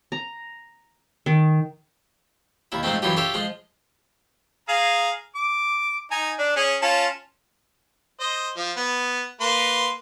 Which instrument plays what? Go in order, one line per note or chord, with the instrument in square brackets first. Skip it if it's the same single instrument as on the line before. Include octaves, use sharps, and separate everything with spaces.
[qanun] A#5
D#3
[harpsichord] D#2 E4
G#2 F3 A3 C4
F#2 E3 F#3 F4 G4
F4 G4 A4 C#5 E5
F3 G#3 F4
[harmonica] G#4 F5 A#5
D6
D#4 G#5 A#5
D4
C#4 G#4
C#4 F4 A5
C5 D#5
F3
B3
A#3 B4 C6